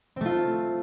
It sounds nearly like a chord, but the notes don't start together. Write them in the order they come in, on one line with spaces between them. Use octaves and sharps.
C4 A3 F4